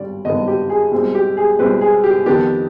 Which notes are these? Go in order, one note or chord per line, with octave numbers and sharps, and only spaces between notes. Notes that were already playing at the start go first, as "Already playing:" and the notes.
Already playing: G#1 G2 D3 G3 D5
G#1 G2 D3 G3 B3 D#5
G4
G#4
C2 B2 G#3 C4
G4
G#4
C2 B2 G#3 C4 B4
G#4
G4
F2 D#3 B3 D4 G4